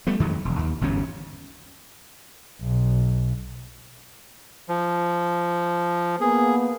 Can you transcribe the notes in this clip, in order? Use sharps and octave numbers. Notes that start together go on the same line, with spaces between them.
G3 A3 B3
F2 D#3 F#3 G#3
E1
D#2
G1 E2 G#2 C#4
B1
F3
A#3 B3 G#4